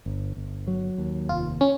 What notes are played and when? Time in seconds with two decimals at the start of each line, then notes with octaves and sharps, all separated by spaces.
0.06 G1
0.37 G1
0.67 F#3
0.98 D#2
1.29 F1 F4
1.61 C#4